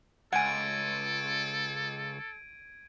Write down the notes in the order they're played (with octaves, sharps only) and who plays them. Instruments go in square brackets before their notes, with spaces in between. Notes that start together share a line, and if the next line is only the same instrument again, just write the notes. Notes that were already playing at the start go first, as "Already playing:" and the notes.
[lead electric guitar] C#2 [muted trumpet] A4 [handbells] F#5 G#5 [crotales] G#6 D7 D#7